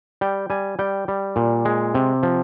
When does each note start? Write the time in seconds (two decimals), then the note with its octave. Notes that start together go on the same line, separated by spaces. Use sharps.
0.21 G3 G5
0.50 G3 G#5
0.79 G3 G5
1.08 G3
1.36 A#2
1.65 G#3
1.94 C3
2.23 F3